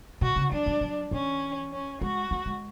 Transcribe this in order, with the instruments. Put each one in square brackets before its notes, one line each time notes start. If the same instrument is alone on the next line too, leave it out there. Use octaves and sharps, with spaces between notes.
[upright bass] B2 [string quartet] F#4
[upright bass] C#3
[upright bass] F#3 [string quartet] D4
[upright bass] F#3
F#3
[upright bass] E3 [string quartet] C#4
[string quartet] C#4
[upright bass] G#3 [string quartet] F#4
[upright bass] A3
G#3